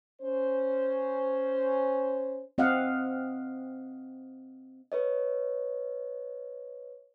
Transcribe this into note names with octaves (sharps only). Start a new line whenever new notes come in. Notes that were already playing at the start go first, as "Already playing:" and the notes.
C#4 C5
C4 D#5 F5 F#5
B4 C#5 D#5